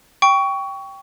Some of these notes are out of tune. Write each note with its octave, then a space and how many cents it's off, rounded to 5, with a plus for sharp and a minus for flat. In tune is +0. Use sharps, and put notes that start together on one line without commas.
G5 +0 C#6 +20